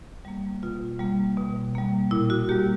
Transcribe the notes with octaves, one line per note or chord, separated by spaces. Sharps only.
G3 A#3
B2 F4
G3 A#3
B2
G3 A#3
A#2 E4
F#4
G3 A#3 G4